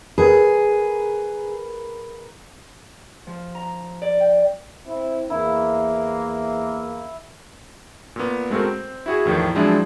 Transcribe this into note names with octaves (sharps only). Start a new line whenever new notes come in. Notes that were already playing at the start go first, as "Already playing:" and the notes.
G#4 A#4 B4
F3
A#5
D5
G5
C4 E4
E2 A#3 E4
A#2 B3
G#3 A3 C4 F#4 A#4
C4
E4 F#4 G#4
E2 A2 D#3 F3
F3 F#3 G#3 C4 D4 E4